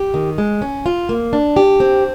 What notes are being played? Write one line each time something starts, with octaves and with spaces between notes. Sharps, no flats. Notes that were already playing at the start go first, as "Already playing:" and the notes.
Already playing: G4
D#3
G#3
C#4
F4
A#3
D4
G4
C4